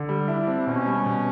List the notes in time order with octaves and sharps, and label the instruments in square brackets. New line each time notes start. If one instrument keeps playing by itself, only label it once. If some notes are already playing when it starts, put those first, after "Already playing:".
Already playing: [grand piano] D3
G3
[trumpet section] D4 [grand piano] E4
[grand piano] C4
[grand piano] B2 [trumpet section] C#4
[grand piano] G3
B2